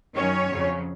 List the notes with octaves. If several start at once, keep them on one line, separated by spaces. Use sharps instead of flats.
F#2 D#3 F#3 C#4 C#5
F2 C#3 F#3